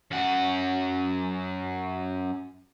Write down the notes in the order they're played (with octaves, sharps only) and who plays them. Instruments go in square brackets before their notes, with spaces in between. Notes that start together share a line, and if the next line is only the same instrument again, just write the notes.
[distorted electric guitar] F#2 F#5